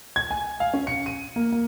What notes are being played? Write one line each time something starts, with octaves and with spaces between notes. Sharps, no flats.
G#6
G#5
F5
C#4
C#7
D#7
A#3
A#3